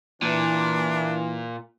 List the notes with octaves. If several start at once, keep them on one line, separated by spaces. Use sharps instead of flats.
A#2 E3 D4